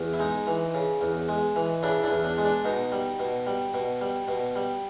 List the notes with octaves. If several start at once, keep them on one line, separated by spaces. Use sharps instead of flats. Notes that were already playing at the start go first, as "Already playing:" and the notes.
Already playing: E2
E4
G#3 D#4
E3
C#3
E2
G#3
E3
C#3 D4 E4
D4 E4
E2
D4
G#3
D4
B2 D#4
G3
B2
G3
B2
G3
B2
G3